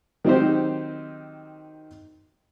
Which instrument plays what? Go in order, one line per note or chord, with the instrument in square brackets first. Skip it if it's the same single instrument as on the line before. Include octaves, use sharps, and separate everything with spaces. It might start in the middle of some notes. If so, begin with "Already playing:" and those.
[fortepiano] D#3 F#3 C4 D#4 G4 C5